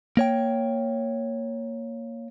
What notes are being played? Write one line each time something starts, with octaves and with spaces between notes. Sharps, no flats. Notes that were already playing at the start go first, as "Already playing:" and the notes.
A#3 C#5 G5